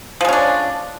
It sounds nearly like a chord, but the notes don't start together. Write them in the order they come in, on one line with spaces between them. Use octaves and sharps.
F3 G#3 C#4 D4